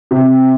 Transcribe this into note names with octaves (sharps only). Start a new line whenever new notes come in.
C3